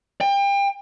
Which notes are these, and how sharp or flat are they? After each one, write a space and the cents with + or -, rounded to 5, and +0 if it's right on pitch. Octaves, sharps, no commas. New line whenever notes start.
G5 +30